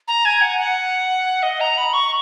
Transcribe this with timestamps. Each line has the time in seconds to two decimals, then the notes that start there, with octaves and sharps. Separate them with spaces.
0.08 A#5
0.25 G#5
0.41 F#5
0.59 F#5
1.43 D#5
1.60 A#5
1.77 B5
1.93 C#6